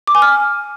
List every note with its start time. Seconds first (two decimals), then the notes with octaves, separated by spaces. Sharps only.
0.07 D6
0.15 G#5
0.22 F6